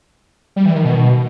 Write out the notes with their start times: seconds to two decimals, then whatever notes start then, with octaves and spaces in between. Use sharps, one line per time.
0.56 G3
0.66 E3
0.75 D#3
0.85 B2